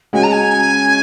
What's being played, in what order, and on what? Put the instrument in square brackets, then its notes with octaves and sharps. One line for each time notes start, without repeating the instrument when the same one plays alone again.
[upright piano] C#3 G#3 C#4 F#4 [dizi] G#5
[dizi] A#5
G#5